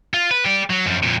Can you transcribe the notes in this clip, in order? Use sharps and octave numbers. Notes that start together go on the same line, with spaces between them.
F4
B4
G4 D5
F#3
F#2 F3
F2 A#2